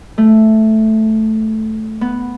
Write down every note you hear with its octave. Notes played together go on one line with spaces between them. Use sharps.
A3
B3